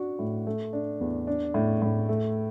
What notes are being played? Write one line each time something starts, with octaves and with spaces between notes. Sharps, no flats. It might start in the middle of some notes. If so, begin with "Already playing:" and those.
Already playing: D4 F#4
A2
A3
D4
E2
D4
A2
A2
A3